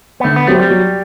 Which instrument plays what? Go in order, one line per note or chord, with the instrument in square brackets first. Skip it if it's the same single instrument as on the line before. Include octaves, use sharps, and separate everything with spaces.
[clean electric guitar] B3
[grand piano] D3 [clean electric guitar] A3
[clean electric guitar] B3
[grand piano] F#3 C4 G4 [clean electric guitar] A3
[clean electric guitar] G3
[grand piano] F#3